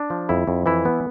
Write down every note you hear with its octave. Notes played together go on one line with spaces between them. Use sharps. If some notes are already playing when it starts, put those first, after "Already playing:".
Already playing: D4
F3
F2 E4
F2
E3 E4
B3